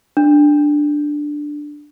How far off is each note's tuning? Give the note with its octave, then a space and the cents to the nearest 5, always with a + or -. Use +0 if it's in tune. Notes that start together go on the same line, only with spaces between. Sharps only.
D4 +5